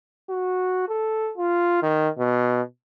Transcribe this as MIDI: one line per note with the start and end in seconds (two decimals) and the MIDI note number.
0.30 0.87 66
0.89 1.32 69
1.38 1.80 65
1.82 2.09 51
2.19 2.62 47